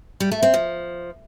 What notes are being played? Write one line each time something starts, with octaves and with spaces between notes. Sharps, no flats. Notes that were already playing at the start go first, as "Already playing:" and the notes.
G3
A3
C4
F3